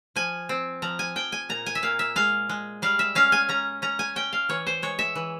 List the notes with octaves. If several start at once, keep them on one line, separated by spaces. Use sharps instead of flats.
F3 G#5
C4
F3 A#5
G#5
F3 G5
G#5
A#2 A#5
G#5
E5
A#2 F5
E5
G#3 F5
G#3
G3 F5
E5
C#4 F5
G#5
C#4 A#5
C#4 A#5
G#5
C#4 G5
F5
E3 C#5
C5
G#3 C#5
E5
E3